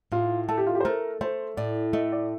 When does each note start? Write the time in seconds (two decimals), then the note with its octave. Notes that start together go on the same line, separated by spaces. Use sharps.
0.12 A2 F4
0.49 A3 A4
0.58 G4
0.67 F4
0.75 G4
0.81 C5
0.85 A3 A#4
1.21 A3 C5
1.57 A2 D5
1.93 A3 D#5
2.12 D5